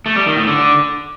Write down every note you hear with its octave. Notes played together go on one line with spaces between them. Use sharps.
A3
G3
D#3
A2
D3